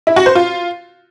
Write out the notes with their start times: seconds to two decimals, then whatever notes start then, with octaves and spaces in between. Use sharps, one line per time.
0.07 E4
0.16 F#4
0.26 C5
0.35 F4